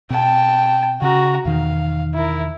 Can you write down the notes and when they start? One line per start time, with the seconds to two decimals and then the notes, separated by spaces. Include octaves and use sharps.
0.10 B2 C4 G5 A5
1.02 C#3 F#4 A#5
1.45 E2 B2 D#3 F5
2.14 E4 A#4